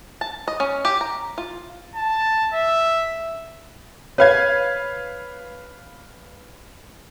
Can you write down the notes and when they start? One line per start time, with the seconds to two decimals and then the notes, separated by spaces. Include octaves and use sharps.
0.21 A5
0.48 D#5
0.60 C#4
0.85 G4
1.01 A#5
1.38 F4
1.95 A5
2.54 E5
4.18 B4 C#5 F5 G#6